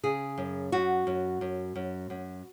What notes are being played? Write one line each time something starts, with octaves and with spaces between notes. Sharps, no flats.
C#3 G#4
F#2
F#2 F#4
F#2
F#2
F#2
F#2